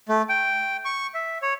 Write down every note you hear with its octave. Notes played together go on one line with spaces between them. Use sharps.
A3
G5
C#6
E5
C#5